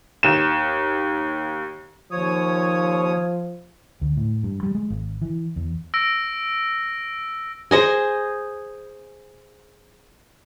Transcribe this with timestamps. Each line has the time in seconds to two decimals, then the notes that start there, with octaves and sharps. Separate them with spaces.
0.23 D#2 E7
2.11 D#2 F3 C#5 D#6
4.01 D2
4.17 A2
4.43 G2
4.63 G3
4.75 G#3
4.90 G#1
5.22 E3
5.56 E2
5.94 E6 A#6 D7
7.71 G#4 C5 D#5 G#5